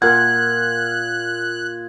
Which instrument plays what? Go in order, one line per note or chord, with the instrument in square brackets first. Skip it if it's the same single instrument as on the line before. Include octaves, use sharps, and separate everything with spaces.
[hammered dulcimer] A#2 [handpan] A#4 F#5 [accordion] F#6 [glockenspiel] G#6